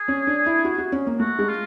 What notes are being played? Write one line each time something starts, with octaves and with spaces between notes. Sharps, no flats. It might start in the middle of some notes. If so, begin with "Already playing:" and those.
Already playing: G#4
C#4
D4
E4
F#4
F#4
C#4
A#3
A3 F#4
G#3
F4